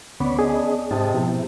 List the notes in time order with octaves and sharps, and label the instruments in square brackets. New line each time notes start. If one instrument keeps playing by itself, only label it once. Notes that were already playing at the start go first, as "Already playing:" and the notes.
[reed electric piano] D2 C#4 [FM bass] B3 [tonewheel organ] C#5 D5 B5
[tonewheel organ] C#4 D#5 [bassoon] D4 [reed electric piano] G#4
[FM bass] G#2 [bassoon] C3 [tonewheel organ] D#5 A5
[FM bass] B2 [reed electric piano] F3 [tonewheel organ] B3 E4 G4